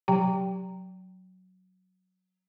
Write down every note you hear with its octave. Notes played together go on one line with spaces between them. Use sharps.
F#3 G4 G5 A#5